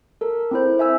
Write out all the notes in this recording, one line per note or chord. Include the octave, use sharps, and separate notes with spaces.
A4 A#4
C4 E4 C5
E5 G#5 E6